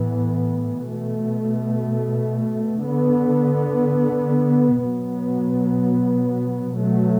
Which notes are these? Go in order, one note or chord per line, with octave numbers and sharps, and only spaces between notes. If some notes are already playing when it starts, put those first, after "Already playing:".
Already playing: A2 E3 B3
B2 A3
D3 B3
B2 F#3 B3
B2 F#3 A3